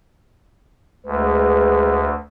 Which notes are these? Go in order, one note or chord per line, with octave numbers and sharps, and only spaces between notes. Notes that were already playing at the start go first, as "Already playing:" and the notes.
D2 G#3 B4